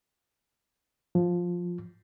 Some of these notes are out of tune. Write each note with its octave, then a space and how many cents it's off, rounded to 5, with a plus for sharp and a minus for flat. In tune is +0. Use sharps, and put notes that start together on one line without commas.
F3 +10